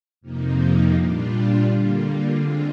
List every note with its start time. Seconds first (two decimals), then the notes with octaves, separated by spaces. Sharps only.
0.21 F2 C3 F3 A#3 D#4
0.92 A#2 G3 D4 F4
1.63 D3 G3 A#3 F4
2.34 D3 G#3 C4 F4